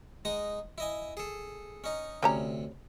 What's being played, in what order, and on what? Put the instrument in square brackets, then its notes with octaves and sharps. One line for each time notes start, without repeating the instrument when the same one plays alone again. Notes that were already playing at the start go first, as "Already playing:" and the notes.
[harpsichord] G#3 D#4 D#6
E4 D#5 G#5
G#4 A4
C#4 D#4
[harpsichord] D2 C3 [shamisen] G3 C#4 A#5